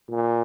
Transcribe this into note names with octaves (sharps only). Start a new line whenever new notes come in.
A#2